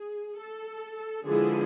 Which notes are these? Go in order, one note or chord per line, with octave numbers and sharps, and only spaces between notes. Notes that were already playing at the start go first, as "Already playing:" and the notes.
Already playing: G#4
A4
D3 F3 G#3 B3 E4 G#4